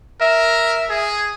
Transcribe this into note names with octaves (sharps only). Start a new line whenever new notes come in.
A#4 E5
G#4